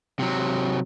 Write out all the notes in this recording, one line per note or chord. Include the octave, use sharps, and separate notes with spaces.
C3 F#3